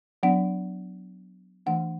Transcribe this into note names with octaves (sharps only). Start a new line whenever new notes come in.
F#3 B3 D4 F#5
E3 A3 D4 F#5